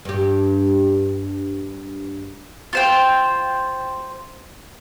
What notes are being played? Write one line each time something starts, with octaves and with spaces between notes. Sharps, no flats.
G2 G4
F4 C5 G5